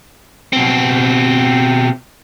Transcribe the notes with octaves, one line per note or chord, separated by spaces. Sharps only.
B2 C4